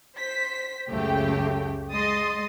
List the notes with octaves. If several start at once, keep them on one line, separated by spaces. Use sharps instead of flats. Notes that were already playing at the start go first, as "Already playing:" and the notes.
C5 B6
C#2 F#2 C#3 A3 G4 G5
G#3 D#5 C6 D#6 A6